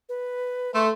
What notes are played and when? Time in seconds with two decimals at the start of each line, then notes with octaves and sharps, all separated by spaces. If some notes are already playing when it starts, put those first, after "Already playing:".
0.09 B4
0.74 A3 C6